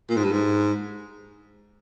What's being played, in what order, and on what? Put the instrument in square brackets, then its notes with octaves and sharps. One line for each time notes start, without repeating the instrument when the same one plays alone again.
[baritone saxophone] A#2
G#2
G2
G#2